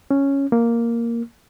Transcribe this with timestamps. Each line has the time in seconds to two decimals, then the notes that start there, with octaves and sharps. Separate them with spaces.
0.11 C#4
0.52 A#3